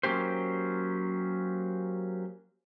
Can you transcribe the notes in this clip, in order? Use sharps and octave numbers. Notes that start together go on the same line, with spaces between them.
F#3 A#3 C#4 G4 C5